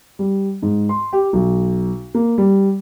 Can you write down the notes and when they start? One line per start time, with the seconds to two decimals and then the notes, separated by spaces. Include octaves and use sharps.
0.19 G3
0.62 G#2
0.89 C6
1.13 G4
1.33 B1
2.14 A#3
2.38 G3